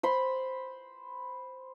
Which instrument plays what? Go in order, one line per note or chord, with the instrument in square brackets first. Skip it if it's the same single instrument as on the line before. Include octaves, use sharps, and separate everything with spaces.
[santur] C5 B5 C6